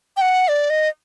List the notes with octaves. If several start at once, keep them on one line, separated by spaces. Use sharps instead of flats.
G5
F#5
D5
D#5